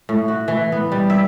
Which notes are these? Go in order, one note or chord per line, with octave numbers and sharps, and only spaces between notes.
A2
F#4
E3
B3
G3
E5